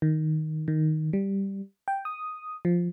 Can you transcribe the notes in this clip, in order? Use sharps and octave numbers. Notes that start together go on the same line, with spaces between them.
D#3
D#3
G3
G5
D#6
F3